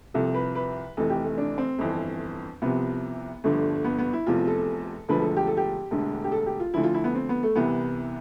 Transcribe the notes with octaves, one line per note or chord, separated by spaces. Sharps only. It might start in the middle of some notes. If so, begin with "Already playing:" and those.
C2 C3 F3 A4
B4
B4
F1 F2 E3 A4
G4
A3
D4
C4
G1 F2 E3
C2 C3 F3 B3
G1 G2 D3 F3 A3
B3
B3
E4
F1 E2 C3 F3 F4
A4
E1 D2 D3 F3 B4
A4
G4
A4
G4
E1 D2 D3
G4
A4
G4
F4
D2 D3 F3 E4
F4
E4
B3
C4
B3
A3
C2 C3 E3 B3